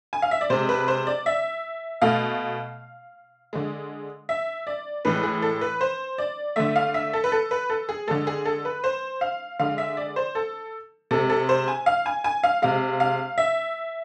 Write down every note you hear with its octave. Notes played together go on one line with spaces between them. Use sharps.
G#5
F5
E5
D5
C3 G#3 C5
B4
C5
D5
E5
B2 A3 F5
D3 G#3
E5
D5
A2 E3 G#3 B4
G#4
A4
B4
C5
D5
D3 A3 E5
F5
E5
A4
B4
A4
B4
A4
G#4
D3 G#3 A4
G#4
A4
B4
C5
F5
D3 G#3 F5
E5
D5
C5
A4
C3 G#3 A4
A4
C5
G#5
F5
G#5
G#5
F5
C3 G#3 F5
F5
E5